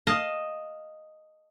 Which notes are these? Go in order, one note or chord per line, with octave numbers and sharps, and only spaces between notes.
D#5 F5 A5